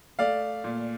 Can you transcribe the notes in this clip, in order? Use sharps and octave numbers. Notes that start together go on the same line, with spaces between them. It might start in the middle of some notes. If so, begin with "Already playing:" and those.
A3 D5 F5
A#2